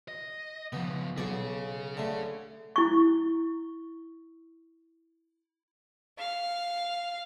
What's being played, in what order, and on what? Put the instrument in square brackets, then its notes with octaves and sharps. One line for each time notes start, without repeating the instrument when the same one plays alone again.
[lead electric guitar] D#5
[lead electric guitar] C#3 F3 [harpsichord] B3
[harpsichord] B1 B2 D5 [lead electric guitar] G#4 C#5
[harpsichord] D3 A3
[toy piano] E4 C#6
[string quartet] F5